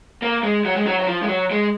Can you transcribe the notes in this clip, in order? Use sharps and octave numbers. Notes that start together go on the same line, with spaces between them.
A#3
G#3
F#3
G#3
F#3
F#3
F3
G#3
F#3
G#3